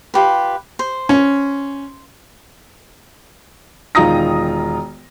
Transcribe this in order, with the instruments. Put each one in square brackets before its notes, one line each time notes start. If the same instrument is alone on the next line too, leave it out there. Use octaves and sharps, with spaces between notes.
[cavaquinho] F4 G4 B4
C5
[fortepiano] C#4
[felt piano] E1 D#3 F4 A#5 D#6 A#6